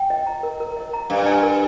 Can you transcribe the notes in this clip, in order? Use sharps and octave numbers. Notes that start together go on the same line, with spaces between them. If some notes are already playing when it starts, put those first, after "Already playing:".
Already playing: G5
D#5
A#5
A#4
A#4
D#5
A#5
G2 F5
G#5
A#4